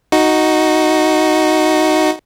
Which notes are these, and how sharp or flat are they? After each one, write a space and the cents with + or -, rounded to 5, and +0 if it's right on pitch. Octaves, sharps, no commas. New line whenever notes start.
D#4 +0 F#4 +0